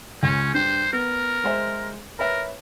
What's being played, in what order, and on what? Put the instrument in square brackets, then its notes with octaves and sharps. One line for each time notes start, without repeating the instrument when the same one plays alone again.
[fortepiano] C#2 [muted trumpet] C#4
[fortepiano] G2 [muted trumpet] C5
[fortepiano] B3 [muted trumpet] A#4
[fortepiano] G#3 C5 E5
[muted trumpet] A#4 [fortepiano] B4 C#5 E5